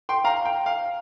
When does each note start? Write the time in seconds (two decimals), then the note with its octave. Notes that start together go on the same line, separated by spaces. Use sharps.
0.09 G5 C6
0.24 F5 A#5
0.45 G5
0.66 F5